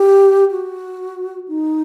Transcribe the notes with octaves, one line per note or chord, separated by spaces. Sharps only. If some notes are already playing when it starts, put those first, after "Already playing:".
Already playing: G4
F#4
D#4